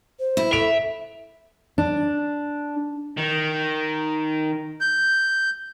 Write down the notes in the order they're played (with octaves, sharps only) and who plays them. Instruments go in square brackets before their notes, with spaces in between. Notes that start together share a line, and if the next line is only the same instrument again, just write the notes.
[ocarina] C5
[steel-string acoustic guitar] E4
[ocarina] A4 [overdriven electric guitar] E5 [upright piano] D7 F7
[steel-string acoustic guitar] D4
[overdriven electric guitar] D#3
[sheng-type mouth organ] G6